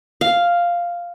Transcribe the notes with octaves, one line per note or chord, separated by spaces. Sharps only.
F5